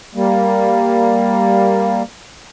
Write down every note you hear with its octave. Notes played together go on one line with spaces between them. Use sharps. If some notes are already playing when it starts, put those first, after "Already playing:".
G3 A#3